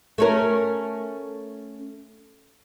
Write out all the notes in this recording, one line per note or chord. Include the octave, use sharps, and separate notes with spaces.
A3 C#4 A#4